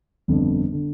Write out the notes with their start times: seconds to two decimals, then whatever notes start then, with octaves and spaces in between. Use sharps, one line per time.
0.28 G1 F2 D3
0.72 D3